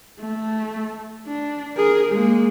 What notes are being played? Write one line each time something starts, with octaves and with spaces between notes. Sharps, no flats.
A3
D4
G#4 A#4
G#3 A#3